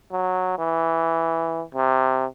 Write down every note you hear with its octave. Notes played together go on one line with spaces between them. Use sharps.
F#3
E3
C3